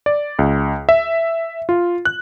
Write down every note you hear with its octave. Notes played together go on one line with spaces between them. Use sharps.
D5
C#2
E5
F4
F#6